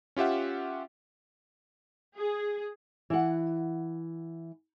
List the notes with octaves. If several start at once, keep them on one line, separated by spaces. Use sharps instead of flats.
C#4 F4 G4 E5 F#5
G#4
E3 F#5